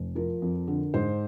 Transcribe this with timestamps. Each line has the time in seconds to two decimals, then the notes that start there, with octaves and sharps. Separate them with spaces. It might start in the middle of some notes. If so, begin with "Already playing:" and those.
Already playing: F1
0.15 F3 A#4
0.42 F2
0.68 D3
0.94 G#2 C5